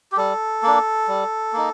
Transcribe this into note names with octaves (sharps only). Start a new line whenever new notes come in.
G4
G3 A4
A#3 D4
G3
A#3 D#4